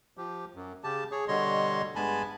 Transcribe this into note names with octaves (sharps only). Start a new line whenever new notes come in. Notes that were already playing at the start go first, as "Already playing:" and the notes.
F3 G4
F#2
C#3 G4 A5
G#4 C#5
B2 D3 G3 C#5 D#5 C6
G2 G#3 B3 G#5 A5 B5